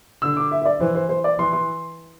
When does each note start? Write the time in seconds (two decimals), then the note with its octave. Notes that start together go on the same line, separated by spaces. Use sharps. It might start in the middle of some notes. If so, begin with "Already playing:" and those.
0.22 D3 E6
0.37 D6
0.51 E5
0.62 E5
0.65 D5
0.80 E3 C5
0.95 C5
1.09 C5
1.24 D5
1.38 E3 C6
1.53 C6